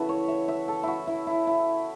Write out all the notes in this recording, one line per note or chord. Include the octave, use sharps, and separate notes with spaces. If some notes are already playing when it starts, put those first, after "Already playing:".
Already playing: C#3 E3 B3 E4 F#4 A4
C#5
E5
E5
A4
E4 F#4
E4
E4
E4